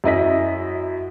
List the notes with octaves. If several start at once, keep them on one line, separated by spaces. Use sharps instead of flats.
F#2 E4 D#5 B6